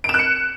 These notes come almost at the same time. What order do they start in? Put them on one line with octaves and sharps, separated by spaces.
D7 E7 F#6 C#7